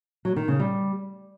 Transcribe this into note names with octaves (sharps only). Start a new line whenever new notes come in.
F#3
D#3
C#3
G3